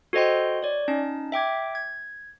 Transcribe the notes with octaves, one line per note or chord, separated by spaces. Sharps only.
F#4 A4 C5 D#5 G5 C6
C#5 D5
C#4 D#4 A5
E5 G5 D6 G#6
G#6